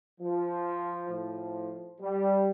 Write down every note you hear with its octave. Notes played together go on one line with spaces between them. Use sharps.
F3
A2 F3
G3